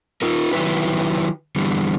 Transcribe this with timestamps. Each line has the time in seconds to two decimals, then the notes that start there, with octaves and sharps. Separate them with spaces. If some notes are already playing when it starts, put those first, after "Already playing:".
0.22 D#4 F4 A#4
0.53 D#3 F#3 D#4 E4 G4 B4
1.56 D3 E3 G3